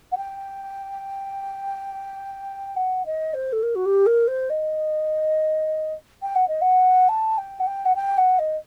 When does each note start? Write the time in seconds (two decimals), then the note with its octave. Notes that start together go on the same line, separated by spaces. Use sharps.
0.12 F#5
0.17 G5
2.76 F#5
3.06 D#5
3.34 C5
3.52 A4
3.63 A#4
3.75 F#4
3.85 G4
4.06 A#4
4.28 C5
4.50 D#5
6.22 G5
6.35 F#5
6.48 D#5
6.61 F#5
7.09 A5
7.38 G5
7.60 F#5
7.67 G5
7.85 F#5
7.96 G5
8.18 F#5
8.39 D#5